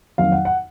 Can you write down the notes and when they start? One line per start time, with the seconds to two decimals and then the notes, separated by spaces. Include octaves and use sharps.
0.18 F2 D#3 F#3 A#3 F5
0.32 F#5
0.45 F#5